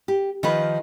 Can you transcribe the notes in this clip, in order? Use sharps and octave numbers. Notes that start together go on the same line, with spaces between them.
G4
D#3 F3 B4